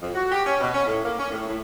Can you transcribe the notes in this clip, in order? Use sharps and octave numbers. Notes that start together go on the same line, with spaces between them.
F2
F#4
G4
C#4
B2
C#4
A2
A#3
C#4
A2
A2